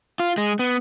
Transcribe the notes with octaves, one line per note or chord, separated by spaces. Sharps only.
F4
G#3
B3